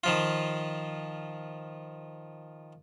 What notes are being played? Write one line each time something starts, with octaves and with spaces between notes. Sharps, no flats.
D#3 F3 F4